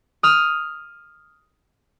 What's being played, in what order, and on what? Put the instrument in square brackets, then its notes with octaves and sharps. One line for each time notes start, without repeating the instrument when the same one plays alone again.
[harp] D#6 F6